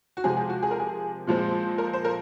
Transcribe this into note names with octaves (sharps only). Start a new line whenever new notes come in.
F#4
C3 F3 G#3 G#4
G#4
F#4
G#4
A#4
G#4
A#2 F3 G#3 C4
A#4
C5
A#4